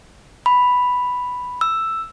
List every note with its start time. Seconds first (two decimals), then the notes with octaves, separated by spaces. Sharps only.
0.46 B5
1.61 E6